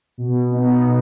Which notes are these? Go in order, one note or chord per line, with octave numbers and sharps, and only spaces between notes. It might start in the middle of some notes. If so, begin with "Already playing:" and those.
B2
B3 D#4
B2